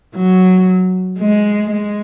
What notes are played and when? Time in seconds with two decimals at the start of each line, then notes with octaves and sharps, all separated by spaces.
0.15 F#3
1.19 G#3
1.70 G#3